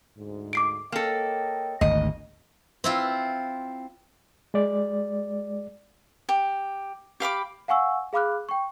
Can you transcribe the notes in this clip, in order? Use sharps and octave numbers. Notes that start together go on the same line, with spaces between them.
D2 G#2
D6 C7 D7
A#3 A4 C#5 D#5 G5
G#1 D2 D#5
C4 E4 F4
G#3 D5
G4
G4 F5 B5 D6
F5 F#5 G#5 C#6 E6
G#4 F5 B5 D6 F6 F#6
G5 C#6